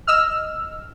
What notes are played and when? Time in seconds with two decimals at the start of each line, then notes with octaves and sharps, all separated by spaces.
0.07 D#5 E6 F6